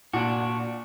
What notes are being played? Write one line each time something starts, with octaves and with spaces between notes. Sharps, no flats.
A#2 D4 F#4